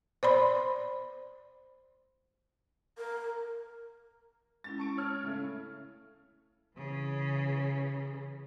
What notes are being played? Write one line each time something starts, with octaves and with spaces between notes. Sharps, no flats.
C5 D5 B5 C6
A#4
G#3 C#4 E4 A6
A5 C#6 D7
C#5 F6
C#3 A3
C#3 E3